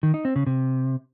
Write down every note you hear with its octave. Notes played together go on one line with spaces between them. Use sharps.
D#3
D#4
C4
C#3
C3